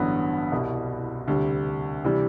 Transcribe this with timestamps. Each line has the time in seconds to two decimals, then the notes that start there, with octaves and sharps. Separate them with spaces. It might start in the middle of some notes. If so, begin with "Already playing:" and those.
Already playing: A1 G2 D3 F#3 B3
0.52 C2 B2 G3
1.28 D2 C3 G3
2.04 C3 E3 G3